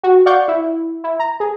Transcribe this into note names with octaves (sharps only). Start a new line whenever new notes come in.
F#4
D5 F5 F#5 C#6 G6
E4
E4
A#5
G#4